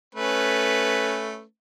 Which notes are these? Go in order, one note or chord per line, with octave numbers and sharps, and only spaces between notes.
A3 C#4 B4